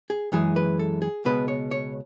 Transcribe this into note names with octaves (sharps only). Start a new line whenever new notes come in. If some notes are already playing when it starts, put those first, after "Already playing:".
G#4
F#2 E3 G#3 G#4
B4
A4
G#4
C#2 B2 G#3 B4
C#5
C#5